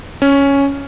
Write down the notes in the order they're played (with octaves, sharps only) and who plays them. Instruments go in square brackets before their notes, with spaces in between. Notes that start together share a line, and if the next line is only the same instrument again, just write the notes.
[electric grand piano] C#4